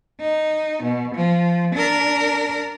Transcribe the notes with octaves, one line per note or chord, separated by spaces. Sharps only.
D#4
B2
F3
D4 A#4